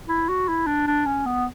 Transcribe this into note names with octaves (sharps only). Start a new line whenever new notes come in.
E4
F#4
E4
D4
D4
C#4
B3